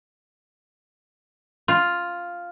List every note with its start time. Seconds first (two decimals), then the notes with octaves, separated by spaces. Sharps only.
1.68 F4